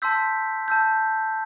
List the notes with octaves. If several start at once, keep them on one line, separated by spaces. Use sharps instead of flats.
A5 C6 E6 G6 B6
A5 E6 G6